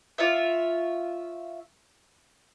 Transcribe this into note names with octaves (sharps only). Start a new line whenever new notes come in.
F4 C#5 E5